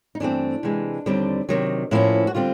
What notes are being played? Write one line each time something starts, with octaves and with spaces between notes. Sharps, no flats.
D#4
G2 E3 A3 C4 D4
C3 E3 G#3
D#2 D3 G3 C4
C3 D#3 F#3
A2 F3 A#3 C#4 E4
F#4
D3 G3 C4 F4